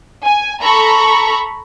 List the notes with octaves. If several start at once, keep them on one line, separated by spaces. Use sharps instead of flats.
G#5
A4 A#5 B5 C#6